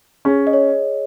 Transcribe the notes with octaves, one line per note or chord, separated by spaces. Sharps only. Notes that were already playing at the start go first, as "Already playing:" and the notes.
C#4 G#4
D#5
C#5